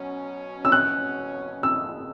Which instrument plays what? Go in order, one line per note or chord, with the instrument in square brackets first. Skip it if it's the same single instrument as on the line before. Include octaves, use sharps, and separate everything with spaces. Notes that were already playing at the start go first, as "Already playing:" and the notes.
Already playing: [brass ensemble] B2 F#3 C#4 F#4
[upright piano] E6
F#6
E6